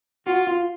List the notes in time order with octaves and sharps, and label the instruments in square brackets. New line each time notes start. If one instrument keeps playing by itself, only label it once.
[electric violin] F4 [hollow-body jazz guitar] F#4
[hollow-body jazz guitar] F4